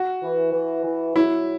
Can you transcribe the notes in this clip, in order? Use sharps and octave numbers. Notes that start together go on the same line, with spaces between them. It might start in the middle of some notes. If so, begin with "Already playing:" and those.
Already playing: F#4
E3
E3
E3
F#3 E4